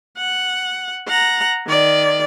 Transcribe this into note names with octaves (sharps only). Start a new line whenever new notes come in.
F#5
F#5 A#5
D#3 D5